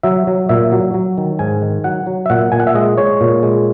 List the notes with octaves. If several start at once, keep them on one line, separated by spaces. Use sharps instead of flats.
F#3 E5
F#3
A#2 E5
F#3
F#3
D#3
G#2 G#5
D#3
F#3 F#5
F#3
E5
A#2 F#5
A#2 G#5
F#5
E5
G#3 D#5
G#3 C#5
A#2
G#3